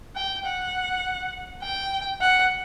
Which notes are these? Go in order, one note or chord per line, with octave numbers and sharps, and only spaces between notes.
G5
F#5
G5
F#5